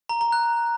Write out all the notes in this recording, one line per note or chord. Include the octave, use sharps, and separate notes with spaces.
A#5
A#5
F#6